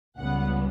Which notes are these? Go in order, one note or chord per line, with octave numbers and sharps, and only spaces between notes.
C#2 C#3 G3 B3 F#5